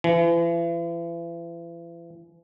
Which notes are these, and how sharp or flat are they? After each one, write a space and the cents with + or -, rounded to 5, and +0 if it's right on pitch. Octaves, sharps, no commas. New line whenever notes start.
E3 +40